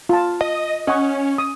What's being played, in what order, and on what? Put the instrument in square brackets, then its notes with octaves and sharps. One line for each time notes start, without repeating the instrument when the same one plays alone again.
[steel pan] F4 A5
[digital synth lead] D#5
[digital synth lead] C#4 [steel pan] D#5 F#5 C#6
[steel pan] D#6